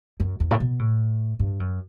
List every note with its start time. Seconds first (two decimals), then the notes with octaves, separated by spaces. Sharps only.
0.20 F#2
0.40 E2
0.51 A2
0.60 B2
0.79 A2
1.39 G2
1.60 F#2